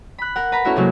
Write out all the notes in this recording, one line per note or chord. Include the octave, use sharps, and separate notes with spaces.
B5 F#6
A#4 F#5
B4 A#5 B5
A3 C#4 E4 F#4 A#4
C3 F#3 G#3 A#3 F#4